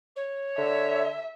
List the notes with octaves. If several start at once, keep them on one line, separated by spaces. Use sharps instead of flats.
C#5
D3 E5